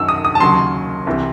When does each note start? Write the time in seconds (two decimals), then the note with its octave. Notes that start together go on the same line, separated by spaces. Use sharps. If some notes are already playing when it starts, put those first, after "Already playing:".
Already playing: F#2 D#3 F#3 E6
0.09 D#6
0.25 D#6
0.35 A5
0.40 D#2 C#3 F#3 C6
1.07 C2 C3 E3